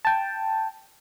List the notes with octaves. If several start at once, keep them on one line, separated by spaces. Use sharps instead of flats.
G5 A5